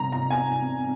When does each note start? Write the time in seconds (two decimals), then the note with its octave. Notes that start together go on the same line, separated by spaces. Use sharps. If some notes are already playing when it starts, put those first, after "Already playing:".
Already playing: C3 G3 C4 D#4 A#5
0.12 A#5
0.30 G#5